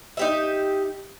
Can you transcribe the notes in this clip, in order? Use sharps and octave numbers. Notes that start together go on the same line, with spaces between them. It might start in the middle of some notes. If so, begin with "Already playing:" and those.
D#4 G4 E5